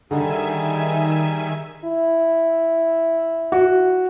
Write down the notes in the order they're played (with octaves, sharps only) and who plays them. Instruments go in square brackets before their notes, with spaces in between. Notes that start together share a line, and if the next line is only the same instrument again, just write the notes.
[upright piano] D3 [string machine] D#3 E5 G#5 [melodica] G3 D#4 G#4
[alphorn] E4
[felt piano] F#4